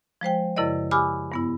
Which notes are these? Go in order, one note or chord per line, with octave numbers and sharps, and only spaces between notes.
F3 G#3 C5 G5
F#2 C#3 E4 A#4 D5 D#5
G4 G#5 B5 D6 E6 F6
G2 B3 E4